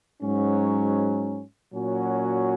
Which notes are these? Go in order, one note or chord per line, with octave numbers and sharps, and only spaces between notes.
G#2 F#3 C#4
A#2 F#3 C#4 F#4